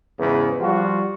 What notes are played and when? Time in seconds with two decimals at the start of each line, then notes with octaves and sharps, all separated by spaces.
0.19 E2 G#2 C#3
0.60 F3 G3 F4 F#4